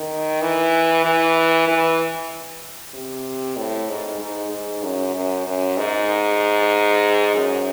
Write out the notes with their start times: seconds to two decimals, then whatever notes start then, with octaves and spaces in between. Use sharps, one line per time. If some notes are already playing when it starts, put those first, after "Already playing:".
Already playing: D#3
0.42 E3
1.05 E3
1.68 E3
2.94 C3
3.58 A2
3.89 G#2
4.21 G#2
4.51 G#2
4.83 F#2
5.15 F#2
5.46 F#2
5.77 G#2
7.35 F#2